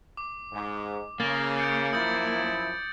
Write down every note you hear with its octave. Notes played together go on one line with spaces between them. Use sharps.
D6
G#2
C#3 A#3 A6
G6 C#7 D7
F#2 F3 E4 D#6 G6 A6